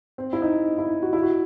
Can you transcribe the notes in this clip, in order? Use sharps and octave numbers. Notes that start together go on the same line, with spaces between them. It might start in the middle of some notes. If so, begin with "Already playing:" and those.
C4
E4
D#4
E4
F#4
E4
F#4